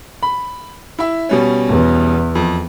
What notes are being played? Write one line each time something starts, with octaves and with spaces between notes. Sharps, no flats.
B5
E4 E5
B2 G3 C#4
E2
F2